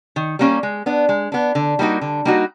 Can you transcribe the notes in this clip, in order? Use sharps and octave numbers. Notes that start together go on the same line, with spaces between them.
D#3
G3 A#3 C#4
G#3
B3 D4
G#3
B3 D4
D3
G3 A#3 D#4 F#4
D3
G3 A#3 D#4 F#4